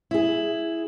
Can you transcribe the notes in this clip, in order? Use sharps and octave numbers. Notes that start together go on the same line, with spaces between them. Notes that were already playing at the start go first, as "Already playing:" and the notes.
E4 G#4